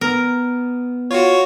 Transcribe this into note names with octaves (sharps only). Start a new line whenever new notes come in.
B3 A#4
F4 F#4 C#5